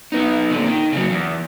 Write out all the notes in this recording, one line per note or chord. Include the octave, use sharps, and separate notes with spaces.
B3 D#4
A#2 D3
D#3
C#3 F#3
E2